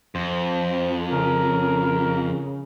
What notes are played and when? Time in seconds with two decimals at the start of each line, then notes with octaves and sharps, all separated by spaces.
0.15 F2 C5
1.12 C#3 A#4